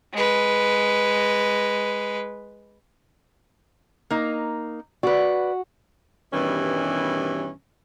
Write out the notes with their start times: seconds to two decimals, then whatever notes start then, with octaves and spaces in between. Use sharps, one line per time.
0.14 G#3 B4
4.10 A#3 D#4
5.03 F#4 B4 D5
6.33 G2 B2 D#3 E3 G3 C#4